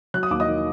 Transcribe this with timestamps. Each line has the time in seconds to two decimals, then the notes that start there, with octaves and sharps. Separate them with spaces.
0.14 F#3 F#6
0.23 D#6
0.31 D#2 D6
0.40 D#5 D#6
0.47 D#3